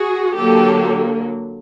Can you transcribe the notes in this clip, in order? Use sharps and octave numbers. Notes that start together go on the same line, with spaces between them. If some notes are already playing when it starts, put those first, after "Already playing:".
Already playing: F#4 G#4
D3 F#3 A#3 G4 A4